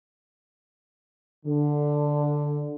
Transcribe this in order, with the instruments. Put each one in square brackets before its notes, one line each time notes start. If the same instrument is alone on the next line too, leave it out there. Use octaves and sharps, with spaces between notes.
[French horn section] D3